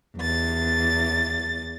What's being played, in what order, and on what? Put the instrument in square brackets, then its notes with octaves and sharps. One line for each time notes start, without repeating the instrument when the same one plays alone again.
[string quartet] E2 A6